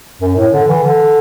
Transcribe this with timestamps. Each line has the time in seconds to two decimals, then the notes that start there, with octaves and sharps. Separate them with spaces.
0.22 F#2
0.36 A2
0.52 D3
0.68 E3
0.83 D3